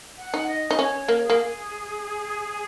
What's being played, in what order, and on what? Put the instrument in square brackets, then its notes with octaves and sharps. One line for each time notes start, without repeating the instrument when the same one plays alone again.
[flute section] F#5
[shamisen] D#4
[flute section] D#5
[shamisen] D#4
[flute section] C5
[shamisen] C#4 [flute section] C#5
[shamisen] A#3
[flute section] G#4
[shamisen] A#3